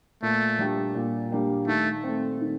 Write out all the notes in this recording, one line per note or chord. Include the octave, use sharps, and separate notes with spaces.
A#2 A3
G3 A#3 D4 G4
A#2
G3 A#3 D4 G4
D#3 A3
C4
A3
D#3